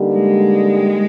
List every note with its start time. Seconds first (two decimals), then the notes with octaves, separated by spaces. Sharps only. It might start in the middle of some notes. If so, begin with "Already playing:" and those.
Already playing: D3 G3 A#3 D#4 G4
0.13 G#3